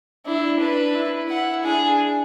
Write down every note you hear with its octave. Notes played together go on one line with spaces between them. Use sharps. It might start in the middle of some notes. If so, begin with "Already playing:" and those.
D4 E4
D4 B4
E4
E4 F#5
D4 G#4